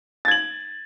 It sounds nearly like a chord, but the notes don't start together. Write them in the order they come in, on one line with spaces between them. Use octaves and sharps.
A6 G#6 F#7